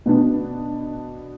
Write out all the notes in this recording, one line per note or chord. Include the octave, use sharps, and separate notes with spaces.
B2 B3 D4